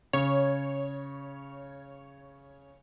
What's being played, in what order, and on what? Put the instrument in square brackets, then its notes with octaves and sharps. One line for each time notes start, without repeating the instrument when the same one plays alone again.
[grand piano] C#3 [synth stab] C#5